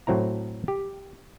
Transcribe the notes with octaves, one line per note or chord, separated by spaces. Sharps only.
A2 F#3 C4 E4 A#5
G4